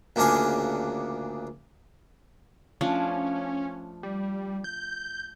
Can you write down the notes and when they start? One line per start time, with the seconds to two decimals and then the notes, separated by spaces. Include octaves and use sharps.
0.16 D2 A#2 C#3 D4 F5 G#5
2.81 F3 A3 C#4 D4
4.03 G3
4.64 G6